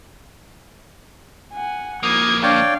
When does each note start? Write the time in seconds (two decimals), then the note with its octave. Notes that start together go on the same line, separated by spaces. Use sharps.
1.53 F#5 G#5
2.03 F2 A#3 D#6 G#6
2.43 D4 C#5 D5 F5 G5